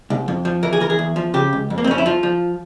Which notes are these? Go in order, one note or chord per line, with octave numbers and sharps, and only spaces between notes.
C2
F2
F3
E3 A#4
G#4
E3 A#4
G#4
E2
F3
C#3 G4
C#2
F2
A#3
C4
F2 C#4
E4
F3 F4
F3